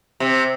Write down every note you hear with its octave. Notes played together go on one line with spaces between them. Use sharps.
C3